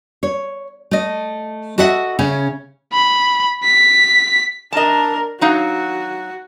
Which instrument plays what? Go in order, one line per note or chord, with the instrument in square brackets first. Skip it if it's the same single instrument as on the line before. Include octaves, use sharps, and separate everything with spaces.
[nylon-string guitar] C#5
A3 D#5
F#4 A4 D#5 E5 F#5
C#3 C#4
[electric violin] B5
B6
[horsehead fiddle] D4 A#4 [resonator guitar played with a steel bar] D#5 A5
[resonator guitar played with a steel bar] F#3 D#4 F5 [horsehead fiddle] F#4